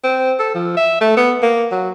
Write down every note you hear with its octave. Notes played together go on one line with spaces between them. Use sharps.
C4
A4
F3
E5
A3
B3
A#3
F#3